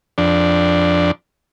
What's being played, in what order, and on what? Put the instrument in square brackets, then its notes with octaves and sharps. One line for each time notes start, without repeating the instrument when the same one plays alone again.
[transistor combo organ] F2 D4